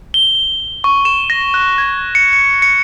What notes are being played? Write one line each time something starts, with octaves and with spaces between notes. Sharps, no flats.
G7
C#6
E7
A#6
F#6
G#6
C#7
C#7
C#7